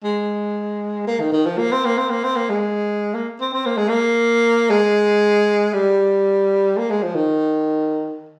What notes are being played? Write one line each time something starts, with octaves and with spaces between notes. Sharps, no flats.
G#3
A#3
D#3
D#3
F3
A#3
C4
A#3
C4
A#3
C4
A#3
G#3
A#3
C4
C4
A#3
G#3
A#3
G#3
G3
A#3
G#3
F3
D#3